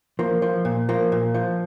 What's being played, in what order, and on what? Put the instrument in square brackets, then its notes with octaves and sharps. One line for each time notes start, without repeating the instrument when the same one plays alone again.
[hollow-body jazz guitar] F3 A#3
F3
A#2
F3 A#3
A#2
F3